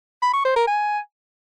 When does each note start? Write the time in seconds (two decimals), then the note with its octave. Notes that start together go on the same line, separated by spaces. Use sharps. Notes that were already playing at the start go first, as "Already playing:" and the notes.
0.22 B5
0.34 C#6
0.45 C5
0.56 A#4
0.67 G#5